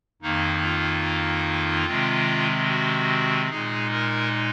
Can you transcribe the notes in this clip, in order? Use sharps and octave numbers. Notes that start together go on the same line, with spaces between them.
F2 D#3 A#3 D#4
F4
C3 D#3 G#3 C4
F#4
A#2 G#3 D#4 G#4
A#4